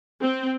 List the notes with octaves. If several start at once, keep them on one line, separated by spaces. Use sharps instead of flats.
C4